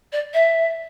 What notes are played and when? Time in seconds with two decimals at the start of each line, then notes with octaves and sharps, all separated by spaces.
0.13 D5
0.34 E5